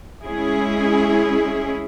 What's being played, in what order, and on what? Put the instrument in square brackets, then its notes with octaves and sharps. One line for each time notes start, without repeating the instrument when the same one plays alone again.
[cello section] G#3 C#4 E4 G#4